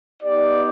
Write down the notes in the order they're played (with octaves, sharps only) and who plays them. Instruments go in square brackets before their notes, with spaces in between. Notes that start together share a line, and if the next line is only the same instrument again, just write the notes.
[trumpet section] B3 D#4 G4 D5